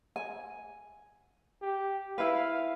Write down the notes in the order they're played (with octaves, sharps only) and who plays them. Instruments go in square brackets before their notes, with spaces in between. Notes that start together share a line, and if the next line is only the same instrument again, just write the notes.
[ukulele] G#5
[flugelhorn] G4
[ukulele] E4 B4 [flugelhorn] F5